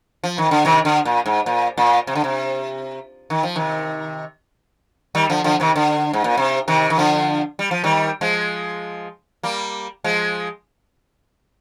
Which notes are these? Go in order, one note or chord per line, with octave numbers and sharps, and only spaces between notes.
F3
D#3
D3
C3 D#3
D3
A#2
G#2
A#2
A#2
C3
D3
C3
D#3
F3
C3 D#3
D#3 G3
D3 F3
D3 F3
C3 D#3
D3
G#2
A#2
C3
C3 D#3
D#3
D3 F3
G3
F3
D#3 G3
F3 G#3
G3 A#3
F3 G#3